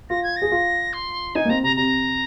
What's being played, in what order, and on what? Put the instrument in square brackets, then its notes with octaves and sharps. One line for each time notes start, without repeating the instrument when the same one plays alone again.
[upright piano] F4 [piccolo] A#6
[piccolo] G#6
A#6
[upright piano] G#4
F4
[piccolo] C6
[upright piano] D#4 [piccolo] G#5
[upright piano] A#3
[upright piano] C4 [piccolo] A#5
[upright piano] C3 [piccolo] A#5
[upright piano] C3 [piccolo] A#5